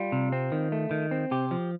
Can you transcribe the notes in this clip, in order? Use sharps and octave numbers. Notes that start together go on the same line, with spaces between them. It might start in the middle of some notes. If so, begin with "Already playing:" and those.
Already playing: G3 F4
C3
C4
D#3
A3
D#3
C4
C3 G4
F3